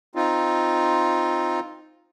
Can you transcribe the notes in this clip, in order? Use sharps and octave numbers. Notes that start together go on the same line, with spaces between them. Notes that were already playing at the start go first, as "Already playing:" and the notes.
C4 D#4 F4